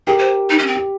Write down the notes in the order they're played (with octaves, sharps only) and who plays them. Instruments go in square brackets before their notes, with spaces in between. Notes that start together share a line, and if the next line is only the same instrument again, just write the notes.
[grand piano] G4 A#4 [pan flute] G#4
[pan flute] C5
D#4
C#4
C4
[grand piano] G4